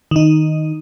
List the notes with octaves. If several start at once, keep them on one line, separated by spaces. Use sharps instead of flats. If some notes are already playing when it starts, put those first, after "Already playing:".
D#3 D#4